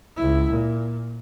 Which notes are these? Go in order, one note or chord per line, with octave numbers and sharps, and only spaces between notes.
C#2 E4
A#2